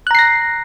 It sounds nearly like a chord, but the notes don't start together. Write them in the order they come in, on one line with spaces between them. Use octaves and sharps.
F#6 A#5 C7 A#6